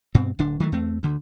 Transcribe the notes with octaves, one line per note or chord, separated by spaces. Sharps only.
G2 B2 C4
D1 D3 D4
D#3 E3 F#3 A3
E2 A3 C4
D2 D3